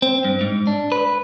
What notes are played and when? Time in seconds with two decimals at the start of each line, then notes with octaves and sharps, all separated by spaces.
0.02 C4
0.25 G2
0.41 G#2
0.67 D4
0.92 B4